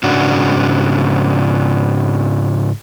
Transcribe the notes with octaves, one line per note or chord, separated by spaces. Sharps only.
G#2 C#3 D4 F#4